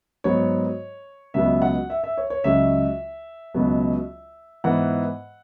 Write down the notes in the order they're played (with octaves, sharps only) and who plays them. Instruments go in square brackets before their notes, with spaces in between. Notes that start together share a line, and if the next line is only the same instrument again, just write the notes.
[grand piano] G#2 F#3 B3 C#5
C#2 B2 F#3 B3 E5
F#5
E5
E5
C#5
C#5
C#2 C#3 F#3 E5
C#2 B2 F#3 B3
G#2 E3 B3 F#5